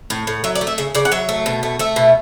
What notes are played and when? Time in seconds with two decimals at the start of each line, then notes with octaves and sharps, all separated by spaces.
0.10 A2
0.27 A2
0.44 F#3 E5
0.55 D5
0.61 A3
0.67 E5
0.78 C#3 E5
0.95 C#3 D5
1.05 F#5
1.12 F#3 E5
1.29 A3
1.46 B2
1.63 A3
1.79 A3 E5
1.96 B2